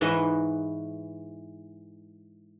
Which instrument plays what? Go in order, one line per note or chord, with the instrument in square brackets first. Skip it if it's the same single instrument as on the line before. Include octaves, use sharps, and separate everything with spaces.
[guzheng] G#2 E3 B4 C#5 D#5 E5